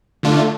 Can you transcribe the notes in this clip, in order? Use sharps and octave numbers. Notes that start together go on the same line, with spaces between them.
D3 A3 D4 F4